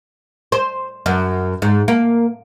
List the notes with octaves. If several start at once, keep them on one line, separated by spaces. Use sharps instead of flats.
C5
F#2
G#2
A#3